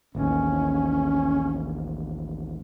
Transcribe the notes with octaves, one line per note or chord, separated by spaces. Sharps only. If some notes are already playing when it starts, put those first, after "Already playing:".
A1 D#2 C#4